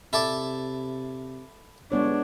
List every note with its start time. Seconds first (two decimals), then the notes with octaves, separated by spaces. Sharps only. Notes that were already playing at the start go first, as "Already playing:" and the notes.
0.13 C3 E4 A4 D5
1.92 G1 G#3 B3 D4 C#5